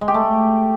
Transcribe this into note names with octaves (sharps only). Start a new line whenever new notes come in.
G#3
G4
A3